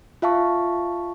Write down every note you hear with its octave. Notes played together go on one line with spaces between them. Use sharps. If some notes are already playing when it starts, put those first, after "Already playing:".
F4 E5 F5 A5 C#6